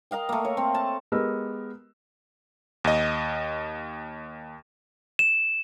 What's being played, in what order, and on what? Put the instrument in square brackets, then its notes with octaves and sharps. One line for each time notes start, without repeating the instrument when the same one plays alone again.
[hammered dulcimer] A#4 D#5 F5 G5
A3 A#3
C#5
C4
A5
[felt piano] G#3 B3 G4 A#4 D#5 E6
[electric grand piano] D#2 D#5
[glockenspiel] E7